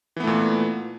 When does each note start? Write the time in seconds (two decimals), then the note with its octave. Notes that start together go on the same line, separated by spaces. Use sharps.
0.16 E3
0.20 B3
0.24 A3
0.27 A#2